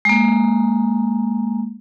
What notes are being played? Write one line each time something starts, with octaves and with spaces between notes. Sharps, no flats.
G#3 A#3